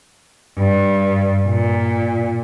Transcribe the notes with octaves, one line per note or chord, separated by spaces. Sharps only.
G2
A#2